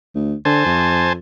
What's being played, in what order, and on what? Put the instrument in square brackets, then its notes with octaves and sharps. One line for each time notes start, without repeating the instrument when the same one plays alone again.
[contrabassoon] D2
[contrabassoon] D3 [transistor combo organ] C5 G#5 A5
[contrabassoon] F2